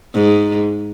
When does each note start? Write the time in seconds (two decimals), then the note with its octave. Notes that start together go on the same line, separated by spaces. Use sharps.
0.14 G#2